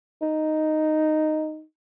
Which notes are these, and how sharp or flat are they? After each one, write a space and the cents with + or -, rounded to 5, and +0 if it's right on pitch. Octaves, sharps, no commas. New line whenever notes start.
D#4 -5